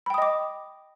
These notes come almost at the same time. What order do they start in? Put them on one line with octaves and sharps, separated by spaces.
B5 G5 D#6 D#5 D6